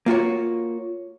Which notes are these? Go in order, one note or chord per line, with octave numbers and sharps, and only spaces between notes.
A#3 F4 F#4 C#5